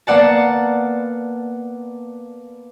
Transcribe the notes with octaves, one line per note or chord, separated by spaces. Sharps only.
A#3 B3 D5 F#5 A5